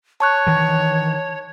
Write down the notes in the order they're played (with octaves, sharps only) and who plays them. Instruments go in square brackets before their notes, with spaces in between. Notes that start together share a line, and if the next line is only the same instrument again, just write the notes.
[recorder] C#5 [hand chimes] A5 C#6 F#6
[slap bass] D#3 E3